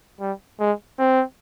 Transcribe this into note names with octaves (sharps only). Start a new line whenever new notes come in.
G3
G#3
C4